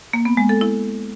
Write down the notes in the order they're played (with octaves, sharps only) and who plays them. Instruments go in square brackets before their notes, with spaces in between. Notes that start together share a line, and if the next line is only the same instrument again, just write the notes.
[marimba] A#3
B3
G#3
A4
E4